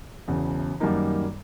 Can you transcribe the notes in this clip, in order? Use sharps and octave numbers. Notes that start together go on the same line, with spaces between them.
E1 E2 C#3
F#2 D#3 G3 A#3 D#4